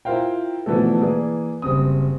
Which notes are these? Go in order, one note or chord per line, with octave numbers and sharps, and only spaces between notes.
E4 F4 A#4 C5 F5 G5
B2 D3 E3 F3 A3 A4
E3 A#3 G#4 D5
F#1 G3 C4 D#6